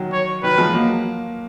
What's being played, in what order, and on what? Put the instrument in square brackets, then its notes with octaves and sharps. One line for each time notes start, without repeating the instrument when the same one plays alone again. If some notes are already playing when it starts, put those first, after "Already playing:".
Already playing: [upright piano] D#3 F#3
[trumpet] C#5
[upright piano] D#3 F#3 [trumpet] B4
[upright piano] F3 G#3
F#3 A#3